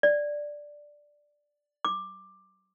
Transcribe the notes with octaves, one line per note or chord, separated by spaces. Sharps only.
D5
D6